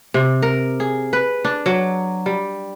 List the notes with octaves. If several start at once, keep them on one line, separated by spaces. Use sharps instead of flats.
C3
A#4
G#4
B4
D4
F#3
G3